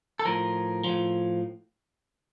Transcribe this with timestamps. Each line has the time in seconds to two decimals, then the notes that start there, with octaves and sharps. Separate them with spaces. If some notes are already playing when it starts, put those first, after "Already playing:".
0.19 A4
0.25 A2 F3 A#4
0.84 A2 F3